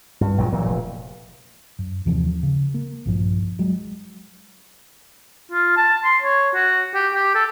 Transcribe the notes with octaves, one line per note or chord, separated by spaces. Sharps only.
G2
A#1 A#2 F3 F#3
A#2 E3 F#3
F1
F#2
D#2 C3 E3 F3
C#3
A#3
A#1 G2 F3
F#3 G#3
F4
A5
C6
C#5
F#4
G4
G4
A4